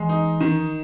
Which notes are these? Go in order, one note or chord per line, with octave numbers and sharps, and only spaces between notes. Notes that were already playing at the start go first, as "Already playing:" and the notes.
Already playing: E3 G#3
D#4
D#3